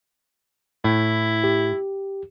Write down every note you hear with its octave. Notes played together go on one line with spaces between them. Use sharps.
A2 E4
G4